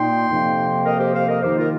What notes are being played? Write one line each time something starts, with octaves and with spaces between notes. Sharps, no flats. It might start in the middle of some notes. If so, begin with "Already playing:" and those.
Already playing: A#2 A#3 D#4 G5 C6
F2 C3 F3 A#3
A#4 D#5
G4 C5
C5 F5
A#4 D#5
D#3 A#3 D#4 G4 C5
F4 A#4